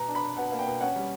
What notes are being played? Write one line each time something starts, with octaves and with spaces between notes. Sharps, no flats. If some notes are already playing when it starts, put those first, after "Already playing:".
Already playing: B2 A#5
D4
B5
B2
B2 F#5
A#3
G5
B2
C#4 F#5
G3